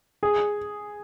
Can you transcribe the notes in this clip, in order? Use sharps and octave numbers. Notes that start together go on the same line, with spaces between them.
G#4